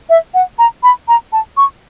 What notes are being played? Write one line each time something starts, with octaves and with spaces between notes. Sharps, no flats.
E5
F#5
A#5
B5
A#5
A5
C#6